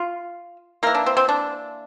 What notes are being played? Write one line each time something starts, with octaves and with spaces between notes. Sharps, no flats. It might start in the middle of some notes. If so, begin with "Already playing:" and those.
Already playing: F4
E3 A#3 A#4
D4
C4
C4
D4